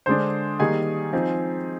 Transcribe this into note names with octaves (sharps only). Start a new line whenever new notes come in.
D3 G#3 D4 C5 C6
D#3 G3 A#3 D#4 G#4 G#5
F3 C4 D#4